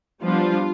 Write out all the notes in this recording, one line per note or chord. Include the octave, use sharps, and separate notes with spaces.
F3 G3 B3 D4 F4